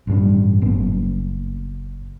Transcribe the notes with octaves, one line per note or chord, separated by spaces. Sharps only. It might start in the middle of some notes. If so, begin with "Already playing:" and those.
A1 G2 G3
F#1 A#3 B3